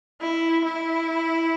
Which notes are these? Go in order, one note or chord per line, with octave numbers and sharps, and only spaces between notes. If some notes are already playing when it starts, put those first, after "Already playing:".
E4
E4